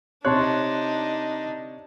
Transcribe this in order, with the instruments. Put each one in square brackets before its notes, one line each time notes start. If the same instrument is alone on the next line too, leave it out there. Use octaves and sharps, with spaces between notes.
[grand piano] C3 C#5 [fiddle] D4 D#4 [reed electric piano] A5 C6 F#6